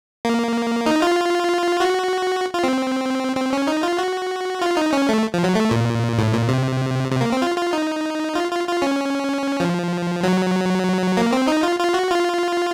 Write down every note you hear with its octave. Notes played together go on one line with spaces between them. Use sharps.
A#3
D#4
F4
F#4
F4
C4
C4
C#4
D#4
F4
F#4
F4
D#4
C#4
A3
F3
F#3
A3
A#2
A2
A#2
C3
C3
A#3
C4
F4
F4
D#4
F4
F4
F4
C#4
F3
F#3
A#3
C4
D#4
F4
F4
F#4
F4